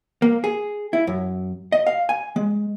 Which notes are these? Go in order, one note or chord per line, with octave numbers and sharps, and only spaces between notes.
A#3
G#4
E4
F#2
D#5
F5
G#5
G#3